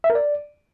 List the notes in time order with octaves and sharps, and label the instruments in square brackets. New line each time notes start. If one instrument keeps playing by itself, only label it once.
[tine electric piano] E5
A#4
D5